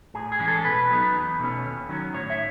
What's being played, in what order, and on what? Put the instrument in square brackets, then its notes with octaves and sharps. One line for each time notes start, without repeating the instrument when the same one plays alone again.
[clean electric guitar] A2 G#4
G#4
E3 G#3 C#4
A4
B2 B4
F#3 B3 D#4
E2
B2 A3 C#4
D#2
D#3 F#3 C#4
A2 C#5
E5